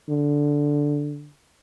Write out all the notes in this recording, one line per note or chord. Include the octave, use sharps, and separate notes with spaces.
D3